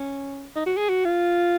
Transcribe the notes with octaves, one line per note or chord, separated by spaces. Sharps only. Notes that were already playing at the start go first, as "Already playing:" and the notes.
Already playing: C#4
D#4
F#4
G#4
F#4
F4